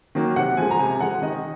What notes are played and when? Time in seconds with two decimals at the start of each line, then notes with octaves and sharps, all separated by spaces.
0.15 D#3 F#3 A#3
0.36 C3 F#5
0.57 F3 G#3 G#5
0.71 A#5
0.79 C3 G#5
1.00 F3 G#3 F#5
1.22 D#3 D#5